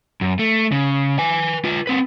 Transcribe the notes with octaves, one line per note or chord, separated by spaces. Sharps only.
F#2
A3
C#3
B4 G#5
F4 B4
C4 B4